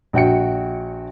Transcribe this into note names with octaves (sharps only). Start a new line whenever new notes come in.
A#1 F#4 G5 C#7